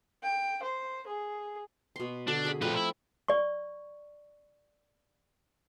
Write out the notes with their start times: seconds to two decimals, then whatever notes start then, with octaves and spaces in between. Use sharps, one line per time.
0.23 G5
0.62 C5
1.07 G#4
1.96 B2 C6
2.28 D3 D4 F#4
2.45 G#4 B5
2.62 A#2 F3 A3 C4 B4
2.76 E4
3.28 D5 C#6